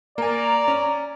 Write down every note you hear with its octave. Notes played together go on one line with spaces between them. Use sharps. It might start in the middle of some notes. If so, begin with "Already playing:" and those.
A#3 D5 G#5 A#5
C#4